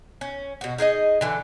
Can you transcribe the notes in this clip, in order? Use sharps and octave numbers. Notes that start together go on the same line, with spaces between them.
C#4
B2 F#4
D#4 G#4 A#4 D#5
D3 E3 A4